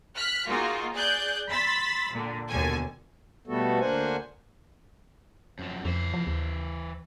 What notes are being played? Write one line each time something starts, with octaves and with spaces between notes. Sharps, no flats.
F6 F#6 B6
A#3 D#4 F4 F#4 G#4
G#4 D5 F#6 G6
B5 C6 E6 A6 B6
A#2 D3
D#2 B2 D3 A4 G#5
B2 G3 A3 B3 F#4 A4
D2 A#3 D4 C5 F#5 G#5
F#2 F3
F2 E3 C5
F3
D#2